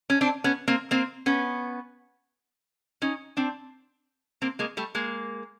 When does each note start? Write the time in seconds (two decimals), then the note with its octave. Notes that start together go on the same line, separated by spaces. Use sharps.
0.10 C#4
0.21 C4 D4
0.44 B3 C#4
0.68 A#3 C4
0.91 A#3 C4
1.26 B3 C#4
3.02 C#4 D#4
3.37 C4 D4
4.42 A#3 C4
4.59 G#3 A#3
4.77 G3 A3
4.95 G#3 A#3